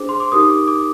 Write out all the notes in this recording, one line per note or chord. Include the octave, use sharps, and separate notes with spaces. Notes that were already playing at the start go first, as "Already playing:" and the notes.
Already playing: D4 G#4 C5 D6
C6
D6
D#4 G4 A#4 D#6
D6
D6